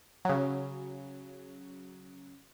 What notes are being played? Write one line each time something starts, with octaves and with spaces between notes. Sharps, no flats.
C#3 F#3